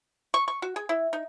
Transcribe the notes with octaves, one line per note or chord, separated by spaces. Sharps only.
C#6
C#6
F#4
G#4
E4
D#4